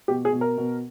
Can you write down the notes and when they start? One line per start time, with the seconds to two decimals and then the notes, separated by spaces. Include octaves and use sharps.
0.08 B2 G4
0.25 G#4
0.33 B2
0.41 A#4
0.58 B2